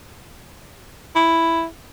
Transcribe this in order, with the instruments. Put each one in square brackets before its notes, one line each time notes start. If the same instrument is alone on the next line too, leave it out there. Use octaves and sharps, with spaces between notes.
[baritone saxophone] E4